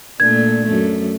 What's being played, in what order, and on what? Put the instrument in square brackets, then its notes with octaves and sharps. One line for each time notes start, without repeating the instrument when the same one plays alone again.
[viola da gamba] A#2 A3 D4 [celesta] G#6
[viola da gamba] F#2 A3